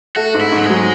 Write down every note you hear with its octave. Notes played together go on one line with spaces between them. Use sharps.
A3 F#4
G#2
E4
G#2
F#3
G#3
F#3